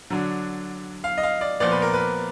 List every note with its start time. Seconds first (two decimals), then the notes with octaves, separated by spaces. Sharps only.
0.10 D3 F#3 D4
1.04 F5
1.18 D#5
1.23 F5
1.41 D5
1.60 A#2 F3 B3 D5
1.72 B4
1.82 A#4
1.94 B4